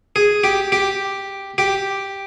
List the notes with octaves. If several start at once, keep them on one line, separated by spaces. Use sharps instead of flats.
G#4
G4
G4
G4